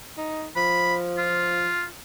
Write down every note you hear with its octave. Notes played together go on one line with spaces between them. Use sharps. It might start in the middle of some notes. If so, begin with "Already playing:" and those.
D#4
F3 B5
F4